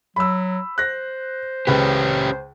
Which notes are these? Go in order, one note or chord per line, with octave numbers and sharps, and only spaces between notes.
F#3 B5 E6
C5 F#6 A#6
C#2 C#4 G4 B4